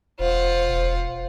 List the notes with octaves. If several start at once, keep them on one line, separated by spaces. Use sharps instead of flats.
E1 F4 C5 F#5
E1